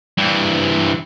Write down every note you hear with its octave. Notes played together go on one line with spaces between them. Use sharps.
G2 E3